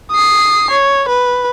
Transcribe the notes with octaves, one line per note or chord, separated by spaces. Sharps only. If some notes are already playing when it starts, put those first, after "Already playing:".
D#6 C7
C#5
B4